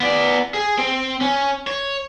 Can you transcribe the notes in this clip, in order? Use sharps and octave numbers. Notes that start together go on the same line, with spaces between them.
B3 D5
G#4
C4
C#4
C#5